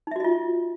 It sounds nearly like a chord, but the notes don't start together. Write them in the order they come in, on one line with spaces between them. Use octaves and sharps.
D#4 E5 F#4 D#5 F4